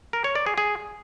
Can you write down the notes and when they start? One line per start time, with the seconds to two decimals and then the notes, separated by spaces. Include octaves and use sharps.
0.13 A#4
0.24 C#5
0.35 D5
0.46 G#4
0.58 G#4